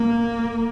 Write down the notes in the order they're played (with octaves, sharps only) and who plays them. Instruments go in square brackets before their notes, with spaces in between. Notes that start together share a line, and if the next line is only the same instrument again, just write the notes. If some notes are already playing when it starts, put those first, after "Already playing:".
Already playing: [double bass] A#3